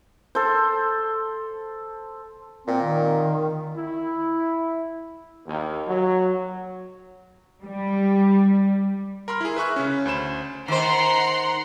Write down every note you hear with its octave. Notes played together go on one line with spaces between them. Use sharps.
A4 C5
A#2 C4
D#3
E4
D#2
F#3
G3
A#4 B5 C6 F6
E4 G#4
B4 E5 C#6 F#6
C#3 C#4
D2 C5 B5 E7
D#3 C5 F#5 A#5 C6